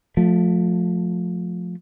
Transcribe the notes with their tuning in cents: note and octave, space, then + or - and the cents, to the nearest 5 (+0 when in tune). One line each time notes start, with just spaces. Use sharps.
F3 +30 A3 +0